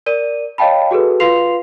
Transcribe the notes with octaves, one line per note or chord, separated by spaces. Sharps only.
A#4 D5 D#7
C#5 D#5 F5 G5 A5 B5
F#4 G#4 A4 B4
F4 B4 F5 C6 C7 F7